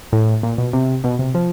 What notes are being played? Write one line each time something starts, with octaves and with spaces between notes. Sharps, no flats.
A2
A#2
B2
C3
B2
C3
F3